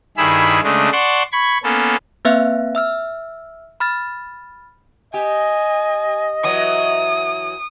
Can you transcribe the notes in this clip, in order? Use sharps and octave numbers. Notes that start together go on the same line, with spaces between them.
G2 D#3 E4 G#4 B5 E6
C#3 G#3 A3 D4
D5 F#5 A5 C6 C#6
B5 C#6 G#6
A#3 B3 C#4 A4
A#3 C4 B4 E5 F5 F#6
E5 E6 F6
B5 F6 A6
G4 D#5 G#5
E3 F#3 D#6